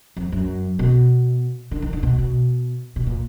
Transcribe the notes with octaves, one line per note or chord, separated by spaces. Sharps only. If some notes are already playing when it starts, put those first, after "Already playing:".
F2
F#2
B2
D3
D#3
D3
B2
B2
B2
A#2